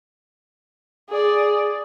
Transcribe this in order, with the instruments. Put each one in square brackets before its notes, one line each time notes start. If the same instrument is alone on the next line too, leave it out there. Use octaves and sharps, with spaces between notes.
[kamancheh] G#4 D5